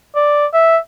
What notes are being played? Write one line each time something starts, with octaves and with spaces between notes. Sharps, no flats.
D5
E5